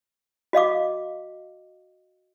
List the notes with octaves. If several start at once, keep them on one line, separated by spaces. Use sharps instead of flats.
F#4 D#5 F5 D6